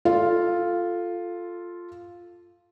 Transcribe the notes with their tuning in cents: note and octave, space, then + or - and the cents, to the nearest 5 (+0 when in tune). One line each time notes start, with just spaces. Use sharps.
F4 +0 A4 +0